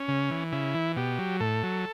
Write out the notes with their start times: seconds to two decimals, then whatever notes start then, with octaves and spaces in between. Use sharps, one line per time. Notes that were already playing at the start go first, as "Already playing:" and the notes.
Already playing: C#4
0.08 C#3
0.31 E3
0.52 C#3 E4
0.74 E3
0.96 B2 G4
1.19 F#3
1.40 A2 A4
1.63 F#3